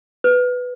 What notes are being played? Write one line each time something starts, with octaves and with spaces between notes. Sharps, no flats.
B4